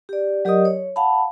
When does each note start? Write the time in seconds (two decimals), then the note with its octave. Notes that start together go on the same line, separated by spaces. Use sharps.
0.09 G4 D5
0.45 F#3 G4 A#4 D5 D#5 D#6
0.65 C#5
0.96 F5 F#5 A5 B5